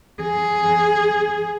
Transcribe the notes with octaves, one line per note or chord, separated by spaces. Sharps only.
G#4